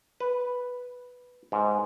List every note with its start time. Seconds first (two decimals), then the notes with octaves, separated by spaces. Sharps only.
0.20 B4
1.52 G#2